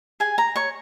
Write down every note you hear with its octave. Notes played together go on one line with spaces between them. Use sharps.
G#4 G#5
A#5
C#5 C#6